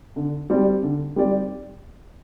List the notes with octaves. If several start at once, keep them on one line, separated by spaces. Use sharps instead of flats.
D3
G3 C4 G4 D5
D3
G3 C4 G4 D5